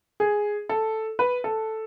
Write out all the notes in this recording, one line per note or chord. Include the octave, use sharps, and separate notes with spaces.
G#4
A4
B4
A4